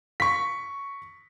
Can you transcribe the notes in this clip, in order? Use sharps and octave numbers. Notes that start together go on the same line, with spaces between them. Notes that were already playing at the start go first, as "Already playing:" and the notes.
C#6 B6